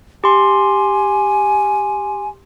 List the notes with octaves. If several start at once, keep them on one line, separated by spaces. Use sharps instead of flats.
G4 G#5 C6